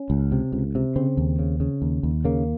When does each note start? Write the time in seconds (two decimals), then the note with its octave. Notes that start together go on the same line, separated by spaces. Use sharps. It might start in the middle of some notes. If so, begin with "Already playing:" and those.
Already playing: C#4
0.10 C#2
0.32 C3
0.52 C#2
0.75 C3
0.96 C#3 C4
1.17 D#2
1.39 C#3
1.60 C#3
1.82 D#2
2.03 D#2
2.25 C#3 A#3